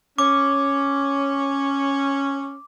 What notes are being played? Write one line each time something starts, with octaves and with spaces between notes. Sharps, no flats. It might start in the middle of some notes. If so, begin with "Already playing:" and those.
C#4 D6